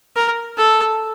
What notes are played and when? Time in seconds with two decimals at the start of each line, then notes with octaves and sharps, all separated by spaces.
0.16 A#4
0.57 A4